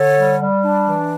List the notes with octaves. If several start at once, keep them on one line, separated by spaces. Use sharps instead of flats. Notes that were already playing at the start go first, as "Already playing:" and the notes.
Already playing: D3 A4 C#5
G3
G3
D4
E3